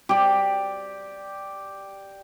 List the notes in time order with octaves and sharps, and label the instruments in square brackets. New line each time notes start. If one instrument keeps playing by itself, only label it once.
[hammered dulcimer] G4 D5